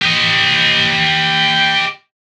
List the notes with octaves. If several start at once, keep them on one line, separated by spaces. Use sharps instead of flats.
G4 D#5